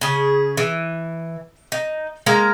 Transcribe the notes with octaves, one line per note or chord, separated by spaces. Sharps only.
C#3 G#4
E3
D#4
G#3 A#3 F5 A#5